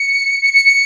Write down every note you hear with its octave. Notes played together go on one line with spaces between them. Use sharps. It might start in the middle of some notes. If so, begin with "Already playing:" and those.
Already playing: C#7
C#7
C#7
C#7